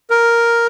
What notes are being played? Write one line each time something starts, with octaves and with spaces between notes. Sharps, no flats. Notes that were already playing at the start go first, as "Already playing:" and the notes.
A#4